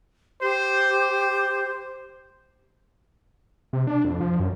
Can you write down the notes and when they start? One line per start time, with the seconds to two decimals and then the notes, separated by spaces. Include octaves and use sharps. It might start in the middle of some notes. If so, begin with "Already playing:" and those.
0.42 G4 C5
3.73 C3
3.87 D4
4.05 F2
4.20 F3
4.40 F#2